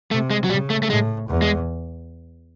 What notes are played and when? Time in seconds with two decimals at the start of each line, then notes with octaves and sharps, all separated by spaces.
0.11 C3 A3
0.30 G#3
0.44 F#3
0.50 C#3 G3
0.70 A3
0.83 A3
0.90 A2 G#3
1.28 E2
1.42 G#3